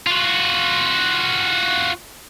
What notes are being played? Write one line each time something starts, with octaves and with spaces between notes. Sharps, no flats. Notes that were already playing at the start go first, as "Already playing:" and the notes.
F4 F#4